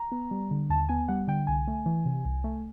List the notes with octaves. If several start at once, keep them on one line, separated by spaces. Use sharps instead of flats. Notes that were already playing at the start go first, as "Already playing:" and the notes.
Already playing: A#5
B3
G3
D3
D#2 A5
B3 G#5
G3 F#5
D3 G5
C2 G#5
A3
E3
C3
C2
A3